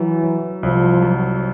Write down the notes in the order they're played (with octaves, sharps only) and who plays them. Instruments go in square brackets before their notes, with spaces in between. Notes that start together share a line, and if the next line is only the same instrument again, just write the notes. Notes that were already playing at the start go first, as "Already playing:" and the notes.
Already playing: [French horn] E3 [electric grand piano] F#3
[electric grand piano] F#3
[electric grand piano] C2 [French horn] F3
[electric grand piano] F#3